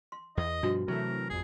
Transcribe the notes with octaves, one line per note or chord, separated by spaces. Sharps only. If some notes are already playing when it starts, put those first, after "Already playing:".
C6
E2 D#5
G2 B2 F3 D4 F#4
C3 E3 F#3 A3 A#4
G#1 F2 G#4